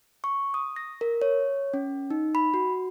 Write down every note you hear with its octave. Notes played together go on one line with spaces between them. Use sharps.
C#6
D#6
A#6
A#4
C#5
C#4
D#4
B5
F#4